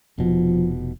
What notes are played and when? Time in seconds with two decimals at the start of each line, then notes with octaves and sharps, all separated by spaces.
0.18 F1 B2 F3